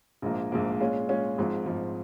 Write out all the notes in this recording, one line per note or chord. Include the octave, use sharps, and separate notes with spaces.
A#1 G#2 F3 A#3
A#1 G#2 F3 A#3
A#2 G#3 C#4 F4
A#2 G#3 C#4 F4
G#1 G#2 F3
G#1 G#2 F3